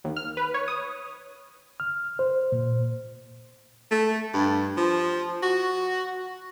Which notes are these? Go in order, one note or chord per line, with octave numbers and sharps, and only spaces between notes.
D#2
F6
B4
C#5
D#6
F6
C5
A#2
A3
G2
F3
F#4